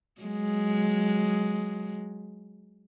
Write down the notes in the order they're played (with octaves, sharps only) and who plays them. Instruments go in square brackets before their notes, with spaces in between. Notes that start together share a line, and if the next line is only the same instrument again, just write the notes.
[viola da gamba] F#3 G#3